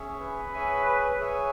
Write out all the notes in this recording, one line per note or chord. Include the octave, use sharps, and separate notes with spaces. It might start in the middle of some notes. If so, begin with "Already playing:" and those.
Already playing: C#4 G#4 C#5 E5
B4
G#4 C#5 E5 G#5
G#4 C#5 E5 G#5